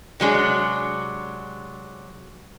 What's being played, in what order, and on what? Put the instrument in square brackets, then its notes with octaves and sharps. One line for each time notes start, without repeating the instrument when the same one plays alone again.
[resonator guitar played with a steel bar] C3 F#3 G#3 D4